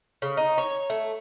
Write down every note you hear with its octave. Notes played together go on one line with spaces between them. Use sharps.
C#3
D#4
C#5
A3